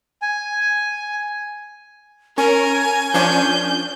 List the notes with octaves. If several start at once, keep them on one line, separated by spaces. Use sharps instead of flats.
G#5
C#4 A#4 G#5
F3 C#4 D4 G6